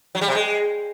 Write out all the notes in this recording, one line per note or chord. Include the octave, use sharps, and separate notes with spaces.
F#3
G3
C3
G#3